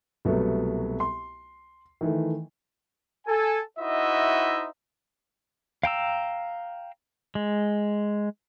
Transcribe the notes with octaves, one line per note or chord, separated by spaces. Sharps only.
C2 B2 F#3 A3 B3
C6
D#3 E3 A3
A4 G#5
D#4 E4 F#4 C5 D#5 E5
F5 G5 A#5 E6
G#3